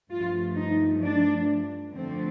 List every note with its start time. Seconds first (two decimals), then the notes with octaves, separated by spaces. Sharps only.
0.10 G2 F3 A3 F4
0.56 D#4
1.02 D4
1.93 F2 D3 F3 A3 C4